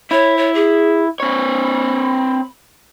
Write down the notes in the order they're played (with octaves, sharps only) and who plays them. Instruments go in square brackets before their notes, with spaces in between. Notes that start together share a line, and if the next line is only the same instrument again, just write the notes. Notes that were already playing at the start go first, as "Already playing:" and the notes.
[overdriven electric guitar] E4 [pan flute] C#5
[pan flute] C#5
G#4
[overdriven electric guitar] C4 C#5 [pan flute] B5